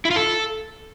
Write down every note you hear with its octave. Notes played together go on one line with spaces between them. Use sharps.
E4
F4
A4